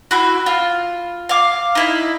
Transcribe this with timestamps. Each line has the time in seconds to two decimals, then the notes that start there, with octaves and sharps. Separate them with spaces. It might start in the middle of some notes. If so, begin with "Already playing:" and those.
0.11 E4 F#4
0.46 F4
1.29 F5 D6
1.75 D#4 E4